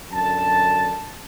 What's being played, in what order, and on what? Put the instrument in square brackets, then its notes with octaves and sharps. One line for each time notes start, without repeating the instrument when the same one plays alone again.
[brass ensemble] F#2 D3 A5